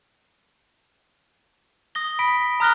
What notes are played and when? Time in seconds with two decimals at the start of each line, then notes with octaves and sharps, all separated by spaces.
1.95 D#6 A#6 G7
2.19 B5 B6 D7
2.60 A#5 D#6 F6 F#6 A#6 G7